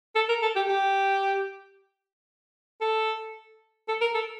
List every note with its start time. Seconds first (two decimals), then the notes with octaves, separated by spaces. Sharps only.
0.15 A4
0.29 A#4
0.42 A4
0.56 G4
0.68 G4
2.81 A4
3.88 A4
4.01 A#4
4.14 A4